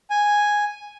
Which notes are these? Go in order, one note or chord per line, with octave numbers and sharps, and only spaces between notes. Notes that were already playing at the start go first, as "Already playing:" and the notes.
G#5